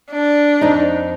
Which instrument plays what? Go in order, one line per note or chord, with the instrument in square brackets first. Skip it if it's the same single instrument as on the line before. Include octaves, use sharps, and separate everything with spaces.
[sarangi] D4
[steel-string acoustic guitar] F2 D#4